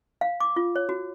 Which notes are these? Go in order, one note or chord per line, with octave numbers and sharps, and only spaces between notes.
F5
D6
F4
C#5
F#4